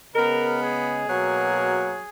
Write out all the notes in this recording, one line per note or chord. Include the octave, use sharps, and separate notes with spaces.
C#3 G#3 B3 A#4
G#4
B2 F#3 A#3